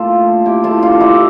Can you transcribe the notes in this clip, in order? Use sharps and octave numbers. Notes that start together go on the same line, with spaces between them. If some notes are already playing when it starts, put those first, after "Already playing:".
Already playing: A#2 A3 D4 F4 A4
E4 G4
F4 A4
D4 F4
E4 G4